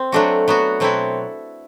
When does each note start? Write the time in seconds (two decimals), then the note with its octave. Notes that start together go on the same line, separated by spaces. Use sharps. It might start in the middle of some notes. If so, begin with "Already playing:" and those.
Already playing: C4
0.12 F#3 A3 D4 F#4
0.48 F#3 B3 F#4
0.80 B2 F#3 C4 E4 A4